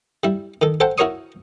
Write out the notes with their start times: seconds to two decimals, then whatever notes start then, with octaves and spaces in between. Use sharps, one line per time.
0.24 G3 E4
0.62 D#3 A4
0.80 A4 C5 F#5 G5 A5
0.98 E4 F#4 A#4 C#5 C#6 D#6